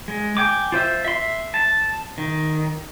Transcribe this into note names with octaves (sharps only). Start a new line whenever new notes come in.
G#3
G5 G#5 D6
F4 C5 E5
E5 C6
A5
D#3